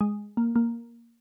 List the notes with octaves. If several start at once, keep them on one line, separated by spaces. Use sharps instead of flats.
G#3
A#3
A#3